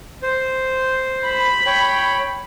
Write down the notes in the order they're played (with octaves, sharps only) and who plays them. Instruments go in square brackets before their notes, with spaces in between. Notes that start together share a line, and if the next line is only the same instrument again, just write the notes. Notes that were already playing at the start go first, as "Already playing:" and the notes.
[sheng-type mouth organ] C5
[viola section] B5
[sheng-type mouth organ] C#5 G5